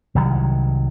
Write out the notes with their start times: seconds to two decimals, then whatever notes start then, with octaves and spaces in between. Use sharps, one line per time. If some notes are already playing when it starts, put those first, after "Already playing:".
0.15 C2 D#3 F#3